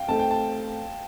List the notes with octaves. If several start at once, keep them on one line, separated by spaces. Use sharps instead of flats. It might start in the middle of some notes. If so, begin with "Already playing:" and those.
Already playing: F5 G5
A3 C4 D#4 A4 A5
G5
A5